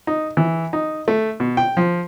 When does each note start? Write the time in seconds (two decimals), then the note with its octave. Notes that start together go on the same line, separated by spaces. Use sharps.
0.07 D#4
0.37 E3
0.73 D#4
1.08 A3
1.40 B2
1.57 G5
1.77 F3